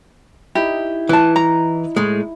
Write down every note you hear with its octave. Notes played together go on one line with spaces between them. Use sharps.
D#4 E4 G4
E3 B4 A5
A#5
A2 G#3